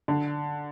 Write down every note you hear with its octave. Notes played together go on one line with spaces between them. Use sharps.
D3